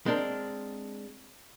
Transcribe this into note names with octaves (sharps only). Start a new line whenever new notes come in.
G#3 C4 D4 A#4